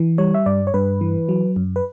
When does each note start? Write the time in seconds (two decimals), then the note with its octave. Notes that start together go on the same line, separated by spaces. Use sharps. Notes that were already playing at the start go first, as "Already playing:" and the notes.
Already playing: E3
0.18 G3 C#5
0.34 E5
0.46 G2 D5
0.67 C#5
0.74 G2 B4
1.01 E3
1.29 F#3
1.56 F#2
1.76 B4